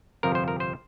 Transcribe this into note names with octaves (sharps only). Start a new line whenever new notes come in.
G1 F2 C3 F3 A#4
C5
A#4
C5